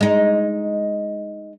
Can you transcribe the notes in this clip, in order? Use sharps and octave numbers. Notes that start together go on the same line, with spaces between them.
G#3 D#4